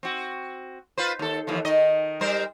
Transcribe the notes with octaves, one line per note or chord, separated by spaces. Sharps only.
C4 F#4
F4 B4 C5
D#2 A4
D#2 E3 F3
D#3 D#5
G3 A#4 C5